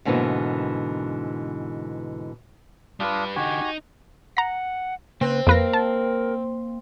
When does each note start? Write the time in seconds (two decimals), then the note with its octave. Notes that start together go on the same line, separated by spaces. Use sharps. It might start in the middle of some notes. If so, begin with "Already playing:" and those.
0.05 G#2 B2 D3 E3 G3 A#3
3.00 G3 D4 F4 B4 D#6
3.36 D3 D#4 F#4 G4 G#5
3.62 D#4
4.37 F#5 A#5 A#6
5.21 C#3 A#3 C4 B4
5.47 F2 A#3 A#4 B4 F5 A#6
5.73 A5